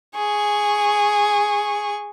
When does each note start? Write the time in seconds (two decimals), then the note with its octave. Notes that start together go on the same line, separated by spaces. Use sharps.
0.15 G#4 C#6